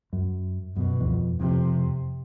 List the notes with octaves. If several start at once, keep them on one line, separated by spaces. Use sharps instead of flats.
F#2
F#2 B2
E2
F2
F2 C3